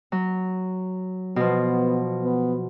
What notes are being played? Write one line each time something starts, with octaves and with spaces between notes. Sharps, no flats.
F#3
B2 F3 B3
B3